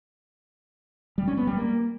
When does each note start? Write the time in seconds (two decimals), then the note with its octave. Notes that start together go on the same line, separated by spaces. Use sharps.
1.18 G3
1.28 C#4
1.37 B3
1.47 G3
1.57 A#3